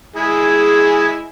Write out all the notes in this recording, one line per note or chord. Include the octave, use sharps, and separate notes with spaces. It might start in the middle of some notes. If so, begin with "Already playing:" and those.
G#3 E4 G#4